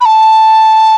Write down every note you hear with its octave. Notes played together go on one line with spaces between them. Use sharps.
B5
A5